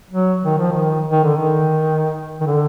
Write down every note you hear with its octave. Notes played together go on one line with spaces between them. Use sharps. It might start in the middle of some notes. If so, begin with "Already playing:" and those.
F#3
D#3
F3
D#3
D#3
D3
D#3
D#3
D3